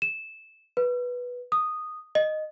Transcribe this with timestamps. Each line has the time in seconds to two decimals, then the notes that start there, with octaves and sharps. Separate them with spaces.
0.02 E7
0.77 B4
1.52 D#6
2.15 D#5